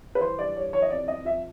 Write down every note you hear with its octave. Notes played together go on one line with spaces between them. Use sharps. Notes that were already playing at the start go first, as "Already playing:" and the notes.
B4
E3 C5
G2 D5
G2 C#5
E3 C#5
D#5
F2 D5
F2 D#5
F3 E5